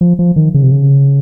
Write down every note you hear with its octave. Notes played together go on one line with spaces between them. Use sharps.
F3
F3
D#3
C#3
C3
C#3